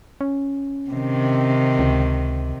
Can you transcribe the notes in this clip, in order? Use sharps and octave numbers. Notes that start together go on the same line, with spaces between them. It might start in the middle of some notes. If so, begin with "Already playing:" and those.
C#4
C3 D#3
C#2